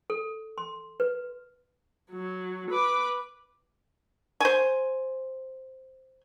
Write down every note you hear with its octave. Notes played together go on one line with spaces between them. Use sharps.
A4
C6
B4
F#3
B4 D6
C5 G#5